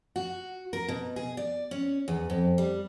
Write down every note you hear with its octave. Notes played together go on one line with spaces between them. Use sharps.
F#4
A#4
B2
G#4
D5
C#4
E2
F2
G3